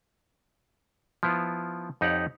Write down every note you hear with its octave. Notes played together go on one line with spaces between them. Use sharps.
F3 B3 E4 F4
F2 D#4 G4 C#5 F#5